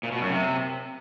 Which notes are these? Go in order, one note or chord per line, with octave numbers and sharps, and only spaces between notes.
A#2
B2
F#2
C3